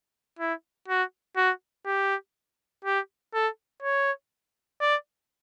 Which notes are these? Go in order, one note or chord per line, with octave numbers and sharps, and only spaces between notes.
E4
F#4
F#4
G4
G4
A4
C#5
D5